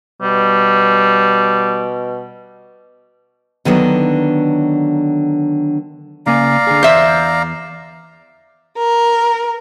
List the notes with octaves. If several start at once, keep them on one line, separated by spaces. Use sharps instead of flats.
B2 G3
D3 D#3 F#3 B3 D4
C#3 A#3 D5 F5 G#5 A#5
D3 G#4
E2 C5 E5
A#4